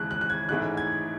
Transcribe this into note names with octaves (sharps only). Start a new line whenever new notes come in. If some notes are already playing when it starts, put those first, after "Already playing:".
Already playing: D#2 C#3 E3 G#3 F#6
F#6
F#6
G#6
A1 G#2 E3 A3 F#6
G#6